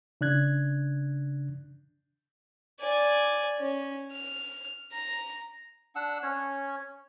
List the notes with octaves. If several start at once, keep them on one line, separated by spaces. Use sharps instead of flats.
C#3 D4 F#6 G#6
D5 G#5
C#4
F6
A#5
D4 F#5 E6
C#4 C#5